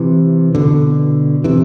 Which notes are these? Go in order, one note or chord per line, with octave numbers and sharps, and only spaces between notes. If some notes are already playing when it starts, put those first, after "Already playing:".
Already playing: C3 E3
B2 D3
C3 E3